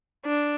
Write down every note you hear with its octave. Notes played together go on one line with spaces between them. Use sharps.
D4